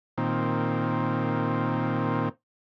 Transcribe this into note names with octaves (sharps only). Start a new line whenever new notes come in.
A#2 D#3 C4